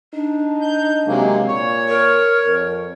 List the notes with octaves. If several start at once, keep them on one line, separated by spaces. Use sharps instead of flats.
D4 D#4
G6
C3 F#3 G#3 A#3
A#2 C#5
A#4
F2